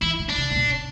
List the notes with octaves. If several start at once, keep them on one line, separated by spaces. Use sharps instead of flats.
E3 E4
D3
D4
C3
C3
B2